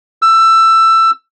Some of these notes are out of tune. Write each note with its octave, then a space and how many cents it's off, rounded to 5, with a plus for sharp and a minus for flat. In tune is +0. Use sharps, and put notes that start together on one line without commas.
E6 +15